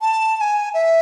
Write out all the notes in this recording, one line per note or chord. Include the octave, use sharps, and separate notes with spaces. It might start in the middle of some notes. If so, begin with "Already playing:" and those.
A5
A5
G#5
E5